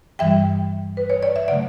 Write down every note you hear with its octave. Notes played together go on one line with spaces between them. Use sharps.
G2 E3 G3 E5 G5
B4
C#5
D5
E5
C#3 F#3 A3 D5 F#5